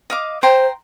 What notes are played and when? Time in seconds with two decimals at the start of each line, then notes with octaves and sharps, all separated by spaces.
0.10 D#5 F5 D6
0.43 C5 G5 A#5 C6